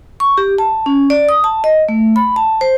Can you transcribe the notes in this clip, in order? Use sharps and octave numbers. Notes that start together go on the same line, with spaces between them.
C#6
G4
A5
C#4
D5
D#6
A5
D#5
A3
B5
A5
C5